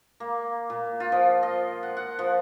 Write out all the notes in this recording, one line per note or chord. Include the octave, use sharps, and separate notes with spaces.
A#3
A#2
F4
F3
D#5
F#5
F#5
F3